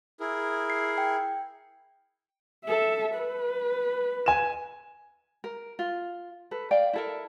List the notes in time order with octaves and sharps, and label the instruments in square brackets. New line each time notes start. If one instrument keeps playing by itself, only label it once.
[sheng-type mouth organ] E4 G#4 A#4
[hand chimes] C7
G5
[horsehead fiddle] A4 E5
B4
[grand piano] G#5 E7
[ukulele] A#4
F4
A4 B4
D5 F5 G5
E4 A4 A#4